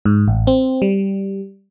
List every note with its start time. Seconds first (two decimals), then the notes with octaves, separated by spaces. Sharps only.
0.05 G#2
0.28 A1
0.47 C4
0.82 G3